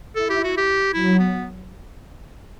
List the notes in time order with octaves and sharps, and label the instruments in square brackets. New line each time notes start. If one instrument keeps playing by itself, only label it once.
[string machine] E4 [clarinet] A4
[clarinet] G4
F#4
G4
[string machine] F#3 [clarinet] E4
[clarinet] B3